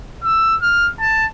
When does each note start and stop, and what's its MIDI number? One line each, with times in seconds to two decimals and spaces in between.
0.24 0.55 88
0.62 0.87 89
1.00 1.25 81